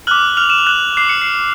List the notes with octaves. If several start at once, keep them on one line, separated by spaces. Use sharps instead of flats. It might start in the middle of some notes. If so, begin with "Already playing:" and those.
D6 F6 F#6 F#7
F6 F7
E7
F7
F#6 F#7
D6 F#6 C7
C#7
C7